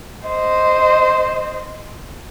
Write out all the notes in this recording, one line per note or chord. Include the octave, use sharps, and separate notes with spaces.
C5 D#5